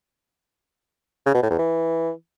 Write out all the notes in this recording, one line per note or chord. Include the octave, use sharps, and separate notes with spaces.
C#3
B2
A2
E2
E3